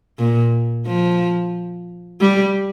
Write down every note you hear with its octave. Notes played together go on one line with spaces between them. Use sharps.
A#2
F3
G3